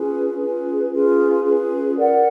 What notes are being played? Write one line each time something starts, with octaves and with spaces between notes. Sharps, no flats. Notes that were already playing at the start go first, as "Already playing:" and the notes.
Already playing: C#4 F4 G#4 B4
C#4 F4 G#4 B4
C#4 F4 G#4 B4
C#4 F4 G#4 B4
A#4 D5 F#5